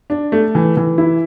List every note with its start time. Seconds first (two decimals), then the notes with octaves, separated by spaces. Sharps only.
0.10 D4
0.32 A3
0.55 E3
0.77 E3
0.98 E4